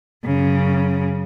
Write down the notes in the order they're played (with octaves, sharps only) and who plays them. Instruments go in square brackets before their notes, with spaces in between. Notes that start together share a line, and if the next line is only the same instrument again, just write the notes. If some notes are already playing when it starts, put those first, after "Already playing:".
[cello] F#2 C#3